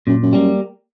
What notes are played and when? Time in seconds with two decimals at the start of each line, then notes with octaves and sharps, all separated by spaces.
0.07 F#2 A#2
0.23 F#2
0.33 G3 A#3